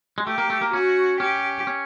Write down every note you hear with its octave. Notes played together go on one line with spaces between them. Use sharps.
G#3
A3 G4
A#3
A3
A#3
C#4 F#4
C#4 G4
C#4